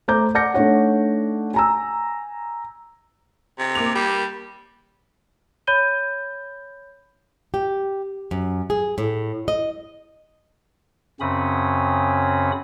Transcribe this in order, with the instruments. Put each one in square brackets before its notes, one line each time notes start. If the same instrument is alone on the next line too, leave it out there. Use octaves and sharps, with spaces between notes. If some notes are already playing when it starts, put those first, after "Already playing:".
[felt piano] A3 C5 A#5 D6 G6
D5 F#5 D6 G6 A#6 C#7
A3 D4 D#4 C#5 F#5
G#5 A#5 E6
[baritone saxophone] C3
[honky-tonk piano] A#3 D6 F7
[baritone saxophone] G3
[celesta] C#5 B5 G6 D#7 G7
[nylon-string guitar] G4
F#2
G#4
A2
D#5
[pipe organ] F#2 C#3 C4 C#4 B5 D#6